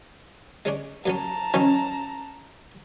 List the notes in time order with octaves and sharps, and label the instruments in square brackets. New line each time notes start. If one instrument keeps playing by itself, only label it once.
[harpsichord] G#3 C#4 D4
[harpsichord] F#2 F#3 C#4 [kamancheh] A5 A#5
[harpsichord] E3 F#3 D#4 [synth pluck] C#4